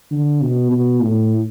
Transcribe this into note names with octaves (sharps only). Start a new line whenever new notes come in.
D3
B2
B2
A2